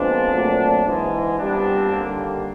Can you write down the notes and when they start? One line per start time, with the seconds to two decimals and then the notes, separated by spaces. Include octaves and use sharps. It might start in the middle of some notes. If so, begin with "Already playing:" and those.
Already playing: A#2 F3 G#3 B3 C4 D4
0.32 A#2 F#3 A3
0.85 G#2 E3 G#3
1.38 C2 A#2 G3 B3 C4 D4
1.92 D#2 D3 G3 A#3